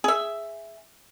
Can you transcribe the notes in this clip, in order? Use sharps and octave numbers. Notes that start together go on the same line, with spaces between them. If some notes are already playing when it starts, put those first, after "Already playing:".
G#4 E5